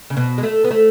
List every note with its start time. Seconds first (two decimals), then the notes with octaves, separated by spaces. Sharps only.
0.10 C#3
0.17 B2
0.38 G#3
0.43 A3
0.64 B3
0.71 A3